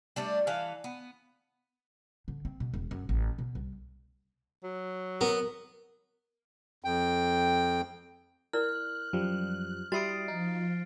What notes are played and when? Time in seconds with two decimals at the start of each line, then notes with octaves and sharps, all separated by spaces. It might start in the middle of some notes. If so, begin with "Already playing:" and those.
0.16 G3 A3 D4
0.47 E3 A4 F5
0.84 B3
2.28 D3
2.45 C4
2.60 B2
2.74 E1
2.91 F#2
3.09 A1
3.38 B2
3.55 C2
4.63 F#3
5.21 B3 A#4
6.84 F2 G5
8.53 E4 A#4 D5 F6 F#6
9.13 F#2 F3 G3
9.92 G3 E4 F#4 D#6 A6 C7 D7
10.28 F3 D#4 F4